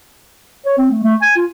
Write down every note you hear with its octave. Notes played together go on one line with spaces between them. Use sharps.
C#5
C4
A3
A3
G#5
F4